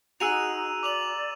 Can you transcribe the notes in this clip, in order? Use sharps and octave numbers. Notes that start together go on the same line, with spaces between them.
D#4 F#4 G#4 A#5 E6 D#7 F7
D5 D6 F7 F#7